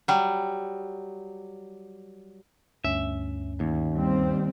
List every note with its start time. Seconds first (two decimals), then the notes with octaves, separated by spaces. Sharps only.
0.08 F#3 G3
2.85 D2 G2 C#4 E5
3.60 D#2
3.95 G3 C4